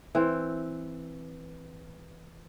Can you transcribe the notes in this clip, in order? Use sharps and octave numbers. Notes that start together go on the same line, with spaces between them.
E3 C4